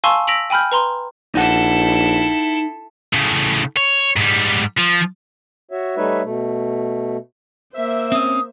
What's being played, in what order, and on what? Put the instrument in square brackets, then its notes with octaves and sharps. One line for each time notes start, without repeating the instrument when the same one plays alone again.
[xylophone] F5 G#5 A5 C6 C#6 E6
E6 A#6 B6 D7 F7 F#7
G5 G#5 B5 F6 G6
B4 A#5 C6
[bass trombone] A#1 [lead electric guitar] D#4 F#5 [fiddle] E4 A4
[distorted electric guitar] A2 C#3
C#5
G#2 G3
F3
[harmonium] F#4 C#5 E5
G3 A3 D#4 B4 C#5 E5
B2 A3
[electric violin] A#3 C5 [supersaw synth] E5
[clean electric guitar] C4 C#4 [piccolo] D#6